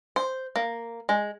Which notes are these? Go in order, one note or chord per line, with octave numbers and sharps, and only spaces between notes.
C5
A#3
G#3